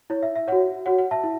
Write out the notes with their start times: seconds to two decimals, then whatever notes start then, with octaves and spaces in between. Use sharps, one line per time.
0.10 E4 C#5
0.23 E5
0.36 E5
0.48 F#4 C#5 F#5
0.86 F#4 C#5 F#5
0.98 F#5
1.11 E5 A5
1.24 E4